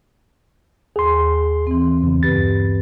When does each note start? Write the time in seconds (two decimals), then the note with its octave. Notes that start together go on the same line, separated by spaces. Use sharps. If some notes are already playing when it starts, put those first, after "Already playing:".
0.96 D#2 G#4 C6
1.67 E3 C4
2.03 E2 C#3
2.23 G2 G4 B4 A6